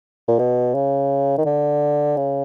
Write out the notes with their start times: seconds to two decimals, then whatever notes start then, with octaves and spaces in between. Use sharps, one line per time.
0.28 A#2
0.39 B2
0.74 C#3
1.38 D#3
1.45 D3
2.16 C#3